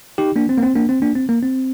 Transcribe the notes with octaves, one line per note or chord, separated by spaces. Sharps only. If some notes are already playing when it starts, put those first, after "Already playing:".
D#4 G4
A#3 D4
C4
A#3
C4
A#3 D4
C4
A#3 D4
C4
A#3
C4